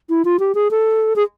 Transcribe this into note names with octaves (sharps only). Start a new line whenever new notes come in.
E4
F4
G4
G#4
A4
G#4